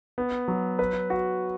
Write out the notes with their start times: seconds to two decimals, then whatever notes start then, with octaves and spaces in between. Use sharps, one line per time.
0.18 B3
0.48 F#3
0.79 B4
1.10 F#4